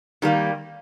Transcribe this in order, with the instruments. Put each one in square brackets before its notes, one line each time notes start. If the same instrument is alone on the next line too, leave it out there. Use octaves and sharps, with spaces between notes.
[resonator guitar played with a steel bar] D#3 G3 A#3